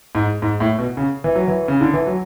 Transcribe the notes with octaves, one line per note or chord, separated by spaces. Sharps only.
G#2
G#2
A2
B2
C#3
E3
F#3
E3
C#3
D3
E3
F#3